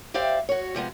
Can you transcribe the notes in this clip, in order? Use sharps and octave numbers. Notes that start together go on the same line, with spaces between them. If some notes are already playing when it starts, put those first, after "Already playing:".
G4 C5 D5 E5 F5 G5
F#4 C#5
C3 F3 G#3 B3